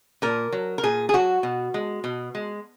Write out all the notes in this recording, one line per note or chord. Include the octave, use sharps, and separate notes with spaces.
A#2 A#4
F#3
A#4
A#2 G#4
G#4
F#3 F#4
B2
G#3
B2
G#3